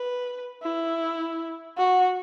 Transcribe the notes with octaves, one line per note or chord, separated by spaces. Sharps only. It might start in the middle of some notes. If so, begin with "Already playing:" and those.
Already playing: B4
E4
F#4